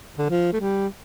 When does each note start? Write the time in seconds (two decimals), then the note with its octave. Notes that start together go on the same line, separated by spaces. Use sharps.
0.18 D3
0.30 F3
0.53 A3
0.60 G3